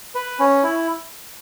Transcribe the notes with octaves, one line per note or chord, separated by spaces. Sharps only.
B4
C#4
E4